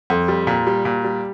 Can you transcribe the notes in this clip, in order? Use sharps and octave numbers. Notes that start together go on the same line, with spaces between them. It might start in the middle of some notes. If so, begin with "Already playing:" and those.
F2
G3
A#2
G3
A#2
G3